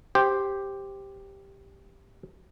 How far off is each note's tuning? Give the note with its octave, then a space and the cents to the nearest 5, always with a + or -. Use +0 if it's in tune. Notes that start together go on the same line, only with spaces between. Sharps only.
G4 +0 C5 +5